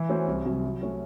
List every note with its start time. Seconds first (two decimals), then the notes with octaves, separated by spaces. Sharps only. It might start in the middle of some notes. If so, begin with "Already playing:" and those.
Already playing: E3
0.09 A3 C#4 F#4 C5
0.27 C2
0.46 C3 F#3
0.64 F#3
0.81 A3 C#4 F#4